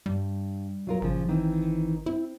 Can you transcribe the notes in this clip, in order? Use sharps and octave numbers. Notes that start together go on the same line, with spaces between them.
G2 G3
F#3 F4 A#4
G#1 A#2 C#3 F3
D#3 E3 C4
C4 E4